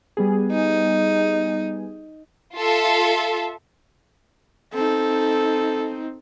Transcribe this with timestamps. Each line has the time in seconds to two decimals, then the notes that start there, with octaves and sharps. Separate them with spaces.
0.17 G3 B3 G#4
0.52 D#4
2.55 F4 A4 E5
4.74 C4 D#4 A4